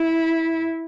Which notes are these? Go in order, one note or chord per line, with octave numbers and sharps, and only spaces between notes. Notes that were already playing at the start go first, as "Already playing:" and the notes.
Already playing: E4